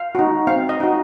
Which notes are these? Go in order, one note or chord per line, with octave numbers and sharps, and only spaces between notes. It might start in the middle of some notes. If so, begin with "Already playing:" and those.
Already playing: F5
D#4 F#4
C4 F5
D#5
D#4 F#4